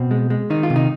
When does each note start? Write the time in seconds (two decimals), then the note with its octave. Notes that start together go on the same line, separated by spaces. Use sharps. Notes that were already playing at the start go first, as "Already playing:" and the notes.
Already playing: B2 C4
0.11 G#3
0.30 G#3
0.50 D#3 D#4
0.63 F4
0.70 C3
0.76 D#4